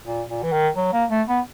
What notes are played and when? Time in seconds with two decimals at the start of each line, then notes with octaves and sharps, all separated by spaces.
0.06 A#2
0.30 A#2
0.43 E3
0.52 D#3
0.76 F#3
0.93 A#3
1.10 A3
1.28 B3